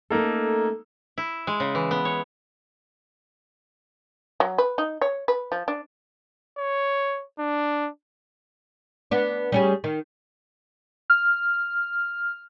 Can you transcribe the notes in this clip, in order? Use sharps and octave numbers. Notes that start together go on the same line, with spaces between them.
A3 A#3 C#4 D#4 A4
E4
G#3
C#3
E3
B3
C#5
F#3
B4
D#4
C#5
B4
F3
D4
C#5
D4
B3 D4
G3 C#4 G#4
D#3
F6